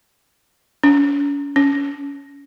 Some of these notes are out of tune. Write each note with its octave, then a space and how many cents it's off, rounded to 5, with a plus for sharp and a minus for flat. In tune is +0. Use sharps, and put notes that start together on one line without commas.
C#4 +40
C#4 +20